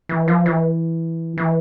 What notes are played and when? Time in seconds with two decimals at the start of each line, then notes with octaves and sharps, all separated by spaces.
0.09 E3
0.28 F3
0.46 E3
1.38 E3